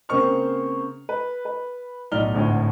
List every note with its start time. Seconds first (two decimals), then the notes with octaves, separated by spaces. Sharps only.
0.09 C#3 A#3 C4 C5 C#6 F6
1.09 B4
1.45 B4
2.12 B1 A2 D#4 D5 F6 G7
2.34 G#1 D2 A2